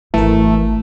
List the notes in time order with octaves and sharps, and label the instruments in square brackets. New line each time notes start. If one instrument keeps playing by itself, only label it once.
[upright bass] G#1 [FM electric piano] E3 A#4 [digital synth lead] A3